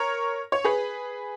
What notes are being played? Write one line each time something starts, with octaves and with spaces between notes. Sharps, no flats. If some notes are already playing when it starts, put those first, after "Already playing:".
Already playing: A#4 C#5
C#5
G#4 B4